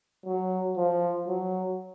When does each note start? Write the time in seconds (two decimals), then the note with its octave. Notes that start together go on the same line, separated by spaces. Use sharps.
0.26 F#3
0.77 F3
1.28 F#3